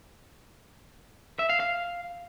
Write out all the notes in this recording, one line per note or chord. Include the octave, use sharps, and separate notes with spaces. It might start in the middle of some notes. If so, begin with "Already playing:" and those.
E5
F5
F5